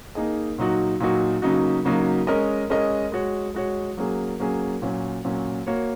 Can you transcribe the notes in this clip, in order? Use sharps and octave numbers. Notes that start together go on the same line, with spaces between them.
A#3 D#4 G#4 D#5
A#2 F#3 D#4 F#4
A#2 F#3 D#4 F#4
C#3 F#3 A#3 D#4 F#4
C#3 F#3 A#3 D#4 F#4
G#3 C#4 A#4 D#5
G#3 C#4 A#4 D#5
G#3 F#4 C#5
G#3 F#4 C#5
F#3 A#3 C#4 G#4
F#3 A#3 C#4 G#4
A#2 F#3 C#4
A#2 F#3 C#4
A#3 F#4 C#5